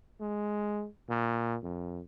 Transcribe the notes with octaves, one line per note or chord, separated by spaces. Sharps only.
G#3
A#2
F2